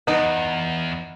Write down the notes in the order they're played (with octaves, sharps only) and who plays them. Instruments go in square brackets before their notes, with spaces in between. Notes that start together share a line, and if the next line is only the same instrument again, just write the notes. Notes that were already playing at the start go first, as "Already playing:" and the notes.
[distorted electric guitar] E2 [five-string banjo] B3 D#4